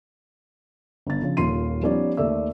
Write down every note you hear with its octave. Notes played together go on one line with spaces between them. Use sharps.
G1 A6
C#3 F3
D#1 D#2 F4 C6 C7 D#7
F3 G3 B3 C#4 D#4 D5
D#2 A3 A4 D5 E5 E6